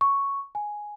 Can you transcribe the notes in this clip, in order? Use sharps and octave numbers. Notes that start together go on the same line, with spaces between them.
C#6
G#5